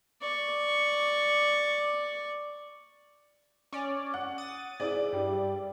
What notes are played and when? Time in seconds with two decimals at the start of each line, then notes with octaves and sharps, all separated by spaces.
0.22 D5 C#6
3.72 C#4 D5
4.14 F#5
4.38 D#6 A6
4.80 G#2 E4 D5
5.13 G2 G3